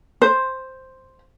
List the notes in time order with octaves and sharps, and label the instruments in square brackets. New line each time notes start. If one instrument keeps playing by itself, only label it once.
[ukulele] C5